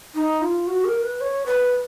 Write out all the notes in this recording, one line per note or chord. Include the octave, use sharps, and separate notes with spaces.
D#4
F4
F#4
A#4
B4
C#5
B4